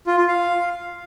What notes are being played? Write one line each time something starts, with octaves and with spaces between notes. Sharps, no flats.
F4
F4
F5